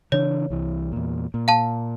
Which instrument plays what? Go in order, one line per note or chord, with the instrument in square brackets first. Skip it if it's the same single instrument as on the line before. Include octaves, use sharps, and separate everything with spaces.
[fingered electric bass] C#3 E3 D4 [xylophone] C#5
[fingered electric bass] C2 E3
E2 A#2
A#2
[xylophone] F5 A5